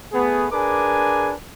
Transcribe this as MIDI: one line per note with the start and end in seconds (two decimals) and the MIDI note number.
0.12 0.47 57
0.12 0.47 59
0.12 0.47 68
0.51 1.32 62
0.51 1.32 68
0.51 1.32 70
0.51 1.32 71
0.51 1.32 80
0.51 1.32 86